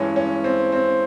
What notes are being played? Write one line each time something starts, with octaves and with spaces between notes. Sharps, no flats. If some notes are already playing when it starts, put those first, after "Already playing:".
Already playing: G2 E3 G#3 C#4
C#4
C4
C4